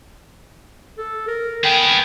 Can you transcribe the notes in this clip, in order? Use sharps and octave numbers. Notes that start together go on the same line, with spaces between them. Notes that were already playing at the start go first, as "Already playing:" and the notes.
A4
A#4
B3 G#4 G5